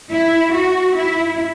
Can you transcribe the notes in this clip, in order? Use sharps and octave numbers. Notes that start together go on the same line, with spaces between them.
E4
F#4
E4